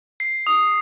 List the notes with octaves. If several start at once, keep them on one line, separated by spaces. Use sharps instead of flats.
C7
D#6